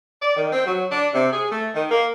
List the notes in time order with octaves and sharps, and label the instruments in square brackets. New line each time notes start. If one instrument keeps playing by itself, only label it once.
[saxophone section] D5
D#3
C4
F#3
D4
C3
G#4
A3
D#3
A#3